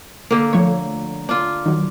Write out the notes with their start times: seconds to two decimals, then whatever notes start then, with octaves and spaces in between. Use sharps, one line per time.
0.31 D3 A#3
0.53 F3 A3 C#5
1.29 D4 F4
1.66 D#3 F#3